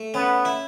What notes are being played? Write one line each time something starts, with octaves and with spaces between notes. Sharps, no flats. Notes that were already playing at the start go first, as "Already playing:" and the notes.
Already playing: A3
B3 C#4
E4